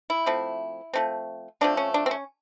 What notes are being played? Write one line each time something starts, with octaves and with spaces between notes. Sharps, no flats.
E4
F3 A3 C4
F3 A3 C4
F3 A3 C4 D4
C#4
D4
C4
C#4